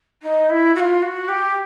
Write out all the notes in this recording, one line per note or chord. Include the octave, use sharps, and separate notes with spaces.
D#4
E4
F#4
F4
F#4
G4